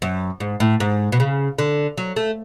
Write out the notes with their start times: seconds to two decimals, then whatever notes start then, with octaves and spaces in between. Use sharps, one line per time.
0.02 F#2
0.40 G#2
0.60 A2
0.80 G#2
1.12 B2
1.20 C#3
1.58 D3
1.97 F#3
2.16 A3